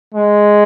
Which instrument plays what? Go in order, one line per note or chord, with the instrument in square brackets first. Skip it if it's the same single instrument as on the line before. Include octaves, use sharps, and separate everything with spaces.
[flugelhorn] G#3